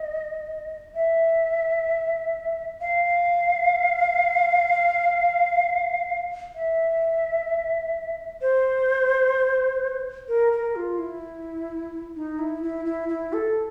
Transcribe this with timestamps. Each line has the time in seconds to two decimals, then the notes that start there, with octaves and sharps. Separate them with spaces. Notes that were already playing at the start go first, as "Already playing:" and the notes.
Already playing: D#5
0.95 E5
2.81 F5
6.55 E5
8.41 C5
10.28 A#4
10.53 A#4
10.76 F4
10.99 E4
12.16 D#4
12.39 E4
12.63 E4
12.85 E4
13.09 E4
13.33 A4